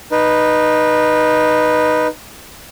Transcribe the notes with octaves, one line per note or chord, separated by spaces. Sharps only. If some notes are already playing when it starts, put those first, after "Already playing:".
D#4 B4